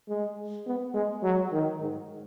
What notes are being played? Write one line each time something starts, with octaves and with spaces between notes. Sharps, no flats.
G#3
B3
G#3
F#3
D#3
G#2